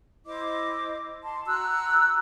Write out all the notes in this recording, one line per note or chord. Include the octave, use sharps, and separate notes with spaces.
E4 C5 D#5 D6
A5 C6
F#4 A#5 E6 F#6